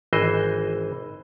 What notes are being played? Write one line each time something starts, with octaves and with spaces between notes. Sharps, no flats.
G#1 E3 C5 D#5